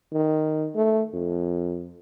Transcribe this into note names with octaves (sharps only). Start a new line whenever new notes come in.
D#3
A3
F2